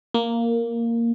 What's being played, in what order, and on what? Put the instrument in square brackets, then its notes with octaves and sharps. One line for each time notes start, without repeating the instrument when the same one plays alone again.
[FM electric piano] A#3